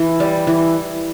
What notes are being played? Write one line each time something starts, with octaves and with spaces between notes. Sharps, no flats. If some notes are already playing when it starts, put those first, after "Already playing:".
Already playing: E3
G3
E3